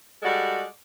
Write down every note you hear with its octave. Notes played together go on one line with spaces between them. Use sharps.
G3 G#3 F#4 A4 D5